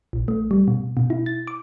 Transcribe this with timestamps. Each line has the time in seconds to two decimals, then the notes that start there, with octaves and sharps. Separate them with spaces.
0.13 A#1
0.28 A3
0.51 G3
0.68 B2
0.97 B2
1.10 E4
1.26 A6
1.47 D6